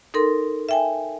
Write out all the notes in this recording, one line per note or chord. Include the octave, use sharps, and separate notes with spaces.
D#4 A4 A#4 C6
E5 G5 G#5